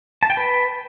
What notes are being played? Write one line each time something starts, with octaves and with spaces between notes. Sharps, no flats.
A5
G5
B4